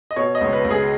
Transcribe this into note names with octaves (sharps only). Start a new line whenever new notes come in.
D#5
B2 C#5
D#5
C#2 C#5
B4
C#2
G#4